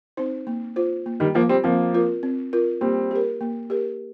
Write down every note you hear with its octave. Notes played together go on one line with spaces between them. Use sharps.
C4 D#4 C5
A#3
F4 C5
A#3
D#3 G3
F3 A#3 F4 C5
G3 C4
F3 A#3 C4
F4 A#4
C4
F4 A#4
G3 A#3 C4
G4 A#4
A#3
G4 A#4